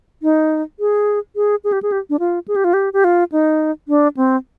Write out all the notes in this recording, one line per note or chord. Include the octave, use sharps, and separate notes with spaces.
D#4
G#4
G#4
G#4
G4
G#4
G4
D4
F4
G#4
G4
F4
G4
G4
F4
D#4
D4
C4